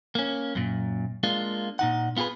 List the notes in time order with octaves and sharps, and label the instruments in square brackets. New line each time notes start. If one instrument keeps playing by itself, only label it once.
[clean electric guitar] A#3 C#4
F#2 A#2
G#3 A#3 D4 F4
A#2 D#4 F#5
B3 F4 G4 G#4 B4